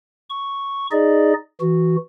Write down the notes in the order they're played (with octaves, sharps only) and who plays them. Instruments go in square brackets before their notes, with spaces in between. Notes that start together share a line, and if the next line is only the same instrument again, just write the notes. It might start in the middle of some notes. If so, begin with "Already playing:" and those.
[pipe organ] C#6
D#4 G#4 D5 D#5
E3 F#4